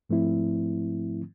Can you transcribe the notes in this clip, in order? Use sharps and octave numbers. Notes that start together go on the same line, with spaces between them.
G#2 F3 A3 C4 E4